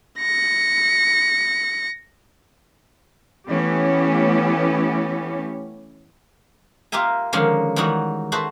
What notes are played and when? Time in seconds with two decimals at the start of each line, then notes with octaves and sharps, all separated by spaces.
0.19 A#6 C#7
3.49 E3 A3 B3 C#4 G4
6.92 A#3 F4 G4 A#4 E5 G#5
7.33 D3 D#3 F3 G#3 A#3 C#4
7.76 D#3 E3 G3 G#3 D#4 F#4
8.32 F#4 G#4 A4 B4 C5 E5